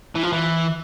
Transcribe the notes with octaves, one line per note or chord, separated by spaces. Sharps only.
E3
F3
E3